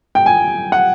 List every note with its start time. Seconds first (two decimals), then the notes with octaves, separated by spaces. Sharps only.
0.15 G5
0.26 G#5
0.72 F#5